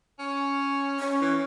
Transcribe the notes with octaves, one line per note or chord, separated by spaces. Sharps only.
C#4
C#4
E3